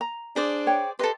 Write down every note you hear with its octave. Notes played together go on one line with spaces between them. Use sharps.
A#5
D4 G#4 C5 D5
C#5 G5
G4 A4 B4 D#5 C6